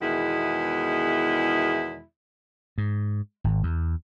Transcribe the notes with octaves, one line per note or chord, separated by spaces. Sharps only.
E2 B2 D#3 G#3 E4
G#2
G#1
E2